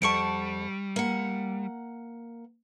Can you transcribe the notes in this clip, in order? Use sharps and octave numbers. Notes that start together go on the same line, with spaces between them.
F2 G3 F#5 A5 C#6 C#7 D7
A#3 F#5